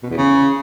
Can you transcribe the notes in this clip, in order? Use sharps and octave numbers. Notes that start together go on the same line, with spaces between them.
B2
E2
C#3